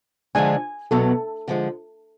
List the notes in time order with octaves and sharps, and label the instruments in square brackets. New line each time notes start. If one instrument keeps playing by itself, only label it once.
[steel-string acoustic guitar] D3 F3 G#3 D4 [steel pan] G#5
[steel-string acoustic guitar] B2 F#3 B3 [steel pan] A4
[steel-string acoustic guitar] D3 F3 G#3